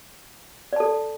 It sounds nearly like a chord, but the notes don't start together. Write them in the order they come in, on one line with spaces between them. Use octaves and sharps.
D5 A5 A4